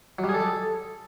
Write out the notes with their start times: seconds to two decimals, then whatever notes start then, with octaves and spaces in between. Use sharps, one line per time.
0.19 F#3
0.24 G3
0.29 G#4
0.34 A4